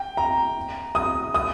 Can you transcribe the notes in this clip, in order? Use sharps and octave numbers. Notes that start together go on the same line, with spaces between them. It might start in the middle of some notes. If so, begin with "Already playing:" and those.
Already playing: G5
A#5
D#6
D#6